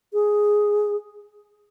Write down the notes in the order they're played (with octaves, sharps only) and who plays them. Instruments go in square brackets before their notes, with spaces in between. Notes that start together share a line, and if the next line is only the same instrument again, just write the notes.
[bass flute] G#4